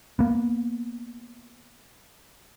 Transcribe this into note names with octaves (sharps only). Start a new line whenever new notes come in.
A#3 B3